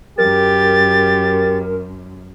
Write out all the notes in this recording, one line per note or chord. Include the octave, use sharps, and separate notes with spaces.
F#2 G4 A#4 A6